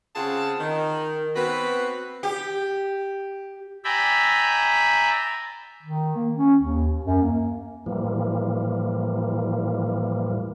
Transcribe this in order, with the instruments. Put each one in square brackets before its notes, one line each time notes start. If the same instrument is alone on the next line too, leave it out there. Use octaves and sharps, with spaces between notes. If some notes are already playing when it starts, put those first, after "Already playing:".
[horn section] C#3 C4 F4 G#4 F#5 A5
D#3
B3 C4 F#4 B4
[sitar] G4
[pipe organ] D5 E5 G5 G#5 A#5 B5
[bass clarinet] D#3
A#3
C#4
D#2
F#2
A#3
[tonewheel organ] A2 E3 F3 G3 A#3